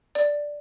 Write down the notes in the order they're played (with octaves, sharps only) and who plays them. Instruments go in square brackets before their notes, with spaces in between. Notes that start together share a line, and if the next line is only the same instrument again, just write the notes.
[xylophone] D5